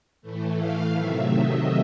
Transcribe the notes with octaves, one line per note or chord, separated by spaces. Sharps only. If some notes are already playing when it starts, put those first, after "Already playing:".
A2 E3 A3
F5
C3 D#3 F#3 A3 E5
D#5